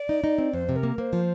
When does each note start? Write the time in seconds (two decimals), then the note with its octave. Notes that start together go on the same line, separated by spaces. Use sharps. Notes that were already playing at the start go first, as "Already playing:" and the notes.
Already playing: D5
0.09 D#4
0.24 D#4
0.38 C4
0.53 F2 C5
0.69 C3
0.75 A#4
0.83 A#3
0.98 A#3 C5
1.13 F3